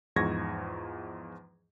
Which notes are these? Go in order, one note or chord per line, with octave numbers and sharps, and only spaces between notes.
E2 G#2 F3 C#6 G#6 A#6